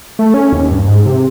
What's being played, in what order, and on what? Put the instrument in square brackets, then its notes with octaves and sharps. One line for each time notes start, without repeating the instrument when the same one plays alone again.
[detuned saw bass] A3
C#4
D#2
G2
G#2
C3